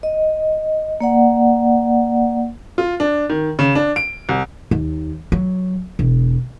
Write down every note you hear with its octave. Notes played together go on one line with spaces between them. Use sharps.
D#5
A#3 D5 F#5
F4
D4
D#3
C#3
D4
D7
C2
D#2
F#3
E1